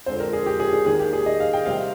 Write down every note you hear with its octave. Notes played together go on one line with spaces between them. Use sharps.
F2 D3 G#3 C4 C5
A#4
G#4
G4
G#4
G#4
D#2 D#3 A#3 G#4
G4
G#4
D#5
F5
G5
C3 G3 C4 F5